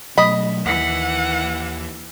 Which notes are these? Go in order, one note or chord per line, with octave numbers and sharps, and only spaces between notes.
B2 F#3 A3 D#5 B5
D#2 E3 F#5